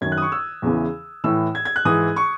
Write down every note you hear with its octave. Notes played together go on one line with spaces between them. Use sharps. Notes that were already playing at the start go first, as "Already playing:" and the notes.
F#2 D#3 G#6
F#6
D#6
C#6
E6
E2 C#3 E3
A2 E3 E6
G#6
G#6
F#6
G#2 E3 D#6
C#6